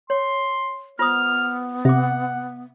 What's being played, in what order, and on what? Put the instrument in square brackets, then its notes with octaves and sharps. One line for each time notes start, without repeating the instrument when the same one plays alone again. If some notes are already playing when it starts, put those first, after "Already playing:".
[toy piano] C#5 [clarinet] C6
[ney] B3 [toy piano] F4 C5 D#6 [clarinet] F6
[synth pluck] C3 [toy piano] E5 D6 [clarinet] F#5